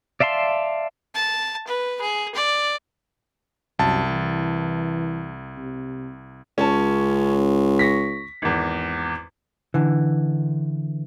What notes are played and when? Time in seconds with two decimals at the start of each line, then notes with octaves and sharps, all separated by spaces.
0.20 D5 E5 F5 A5 C6
1.15 A5
1.68 B4
2.02 G#4
2.35 D5
3.79 C2 F#2 A5
4.10 E3
5.58 C3
6.58 C#2 C#4 A5
7.79 C#6 A#6 B6
8.42 G#1 E2
9.74 D3 E3